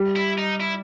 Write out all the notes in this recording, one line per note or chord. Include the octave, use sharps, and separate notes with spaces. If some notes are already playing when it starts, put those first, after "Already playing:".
Already playing: G3
E4
D#4
E4